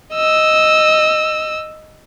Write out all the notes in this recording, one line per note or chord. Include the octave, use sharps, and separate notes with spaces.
D#5 E6